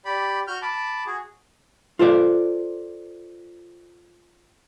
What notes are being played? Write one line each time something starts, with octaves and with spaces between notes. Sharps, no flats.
G4 D5 B5
F#4 F6 G6
A5 B5 D6
F#4 G#4
F4 A4 C5 D5